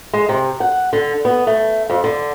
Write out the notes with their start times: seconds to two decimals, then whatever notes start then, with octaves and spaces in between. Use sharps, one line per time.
0.13 G#3
0.29 C3
0.60 F#5
0.93 D3
1.25 B3
1.47 A3
1.90 F2
2.04 D3